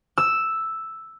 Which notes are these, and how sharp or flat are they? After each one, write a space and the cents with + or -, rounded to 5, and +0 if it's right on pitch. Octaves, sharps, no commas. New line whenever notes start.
E6 +0